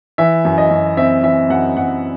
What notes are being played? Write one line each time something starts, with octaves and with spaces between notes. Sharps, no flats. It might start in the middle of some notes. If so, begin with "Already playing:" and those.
E3 E5
F#2
D#5
F#2
C4 E5
E3 E5
F#2 F#5
F#2 F#5